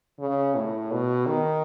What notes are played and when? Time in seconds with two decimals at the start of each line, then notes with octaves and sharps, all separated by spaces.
0.19 C#3
0.55 A2
0.91 B2
1.26 D#3